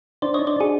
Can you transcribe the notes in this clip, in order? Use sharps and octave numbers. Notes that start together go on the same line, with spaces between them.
D4 C5 D5
D4 C#5 D#5
C5 D5
D4 F#4 G#4